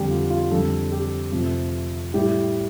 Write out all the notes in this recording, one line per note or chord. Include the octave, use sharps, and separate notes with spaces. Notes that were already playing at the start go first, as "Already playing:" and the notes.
Already playing: F2 D3 G3 G4
F4
F4
F2 D3 G3 A4
G4
F2 C3 F3 A3
A2 G3 G4